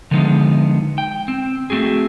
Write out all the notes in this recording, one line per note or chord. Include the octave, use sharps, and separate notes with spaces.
D3 F3 G#3 B3 D#4
G5
C4
A3 C4 F#4 G#4